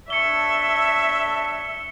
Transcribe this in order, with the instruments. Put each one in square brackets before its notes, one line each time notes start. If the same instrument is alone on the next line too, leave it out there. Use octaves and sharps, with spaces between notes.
[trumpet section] D4 A4 C#5 [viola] E5 [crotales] C#7 G7